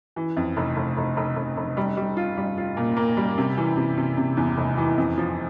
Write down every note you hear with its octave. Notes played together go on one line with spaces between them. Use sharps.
E3
F2
F1
F1
F1
F1
F1
F1
G3
G3
F4
G3
F4
A#2
A#3
G3
C3
E3
C3
C3
C3
E2
F1
E3
F2
F3